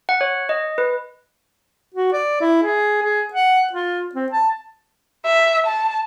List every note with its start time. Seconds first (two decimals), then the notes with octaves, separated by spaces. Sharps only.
0.09 F#5
0.21 C#5
0.49 D#5
0.78 B4
1.95 F#4
2.13 D5
2.41 E4
2.63 G#4
3.02 G#4
3.33 F#5
3.73 F4
4.15 C4
4.32 A5
5.26 E5
5.66 A5